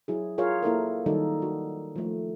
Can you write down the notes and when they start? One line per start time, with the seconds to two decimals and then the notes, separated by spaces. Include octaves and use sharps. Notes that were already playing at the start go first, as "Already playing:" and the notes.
0.08 F#3 E4 G#4
0.38 F4 G#4 A#4 C#5 F5
0.63 A#3 E4 A4 A#4
1.06 D#3 F#3 G3 D#4 A4
1.42 F#4
1.96 F3 A3